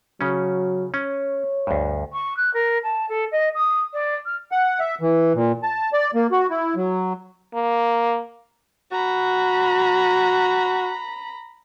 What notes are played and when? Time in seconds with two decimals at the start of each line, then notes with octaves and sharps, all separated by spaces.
0.21 C#3 F#3 C#4
0.94 C#4 C#5
1.67 D2 G2
2.12 C#6
2.36 F#6
2.53 A#4
2.83 A5
3.09 A4
3.31 D#5
3.54 D#6
3.93 D5
4.25 F6
4.52 F#5
4.80 E5
5.01 E3
5.35 A#2
5.63 A5
5.93 D5
6.15 A#3
6.32 F#4
6.50 E4
6.76 F#3
7.54 A#3
8.92 F#4 A#5 B5